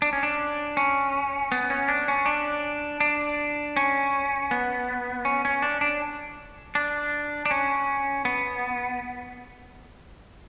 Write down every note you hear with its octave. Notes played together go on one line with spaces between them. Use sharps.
D4
C#4
D4
C#4
B3
C#4
D4
C#4
D4
D4
C#4
B3
C#4
C#4
D4
D4
D4
D4
C#4
B3